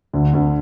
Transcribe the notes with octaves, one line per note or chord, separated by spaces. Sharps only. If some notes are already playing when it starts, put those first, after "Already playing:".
D2 D3
D2 D3